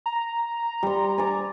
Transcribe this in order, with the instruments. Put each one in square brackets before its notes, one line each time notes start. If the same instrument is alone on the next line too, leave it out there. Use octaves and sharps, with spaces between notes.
[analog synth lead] A#5
[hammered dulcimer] G3 C6
D5 G#5